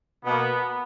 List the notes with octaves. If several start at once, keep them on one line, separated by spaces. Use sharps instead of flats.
B2 A#3 B3